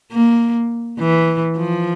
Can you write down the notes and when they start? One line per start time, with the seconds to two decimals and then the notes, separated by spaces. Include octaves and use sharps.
0.12 A#3
0.99 E3
1.57 F3